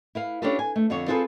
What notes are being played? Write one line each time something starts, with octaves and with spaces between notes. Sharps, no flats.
E4 B4 F5
C#4 D4 F4 G4 A4 B4
G#5
A3
F2 D3 B3 C#5
C4 F4 G#4 A4 B4